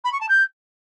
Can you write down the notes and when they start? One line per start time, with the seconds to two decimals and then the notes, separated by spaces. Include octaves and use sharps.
0.04 B5
0.12 C#6
0.20 A5
0.28 G6